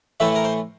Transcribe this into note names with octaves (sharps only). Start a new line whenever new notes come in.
A2 E3 A3 E4 E5
A#4
C5